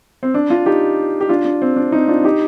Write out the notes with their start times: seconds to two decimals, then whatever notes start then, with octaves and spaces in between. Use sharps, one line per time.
0.23 C4
0.34 D4
0.50 D4 F4
0.66 D#4 G4
1.21 G4
1.29 D4 F4
1.45 D4
1.62 C4
1.76 D4
1.92 C4 D#4
2.08 D4 F4
2.24 D#4 G4